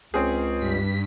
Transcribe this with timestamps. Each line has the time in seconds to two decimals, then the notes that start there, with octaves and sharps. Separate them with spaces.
0.14 C#2 C4 C#4 G#4
0.58 G2 B6